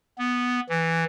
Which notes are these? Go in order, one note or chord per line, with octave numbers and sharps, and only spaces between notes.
B3
E3